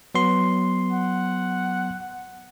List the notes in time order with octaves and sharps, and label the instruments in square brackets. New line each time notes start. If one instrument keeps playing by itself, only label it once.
[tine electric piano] F#3 B3 C6
[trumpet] F#5